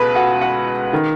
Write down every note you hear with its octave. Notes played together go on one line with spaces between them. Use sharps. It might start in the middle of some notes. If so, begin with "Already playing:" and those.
Already playing: C#2 B2 B4 B5
F#4 F#5
F#4 F#5
D#3